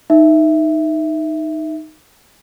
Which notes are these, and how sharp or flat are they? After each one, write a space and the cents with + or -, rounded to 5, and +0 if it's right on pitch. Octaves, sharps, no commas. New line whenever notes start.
D#4 +0 E5 +0